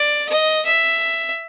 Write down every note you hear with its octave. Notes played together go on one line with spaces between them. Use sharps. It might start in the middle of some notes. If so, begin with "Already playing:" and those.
Already playing: D5
D#5
E5